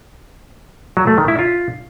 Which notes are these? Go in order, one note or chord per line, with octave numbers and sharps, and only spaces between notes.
F#3
A3
D#3
E4
F4